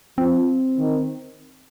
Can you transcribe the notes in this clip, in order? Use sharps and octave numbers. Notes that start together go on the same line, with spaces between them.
F3 C4
D#3